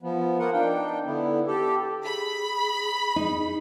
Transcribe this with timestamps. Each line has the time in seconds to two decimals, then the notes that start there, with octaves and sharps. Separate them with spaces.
0.03 F3 B3
0.39 A#3 B3 F4 A#4 F#5
0.53 D4 D#4 G5
1.06 D3 B3 E4
1.47 G4 A4
2.05 G#4 B5
3.16 D#4